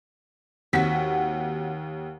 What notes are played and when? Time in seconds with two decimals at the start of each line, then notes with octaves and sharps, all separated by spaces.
0.73 D#2 C4 F#4 F#5 B6